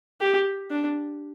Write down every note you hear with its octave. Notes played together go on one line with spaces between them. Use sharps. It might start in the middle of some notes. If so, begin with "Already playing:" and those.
G4
D4